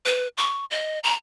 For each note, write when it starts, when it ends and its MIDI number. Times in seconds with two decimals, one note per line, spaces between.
0.05 0.28 71
0.38 0.65 85
0.71 0.99 75
1.04 1.14 82